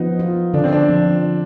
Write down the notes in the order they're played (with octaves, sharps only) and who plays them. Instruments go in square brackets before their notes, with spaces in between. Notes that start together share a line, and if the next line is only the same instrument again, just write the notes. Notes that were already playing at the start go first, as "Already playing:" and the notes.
Already playing: [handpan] F3 B3 [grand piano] D#4
[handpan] F4
[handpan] D3 [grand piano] D4
[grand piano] C4
D4
[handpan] F3